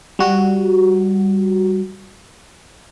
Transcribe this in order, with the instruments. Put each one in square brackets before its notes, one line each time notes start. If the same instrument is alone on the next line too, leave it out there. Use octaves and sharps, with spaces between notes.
[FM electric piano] G3 F#4